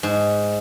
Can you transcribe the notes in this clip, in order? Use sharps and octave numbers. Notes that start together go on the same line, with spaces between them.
G#2